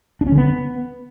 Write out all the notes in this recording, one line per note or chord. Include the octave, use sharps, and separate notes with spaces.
D4
C#4
D3
B3